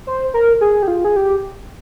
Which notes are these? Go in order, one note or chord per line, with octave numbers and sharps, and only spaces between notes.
C5
A#4
G#4
G4
F4
G#4
G4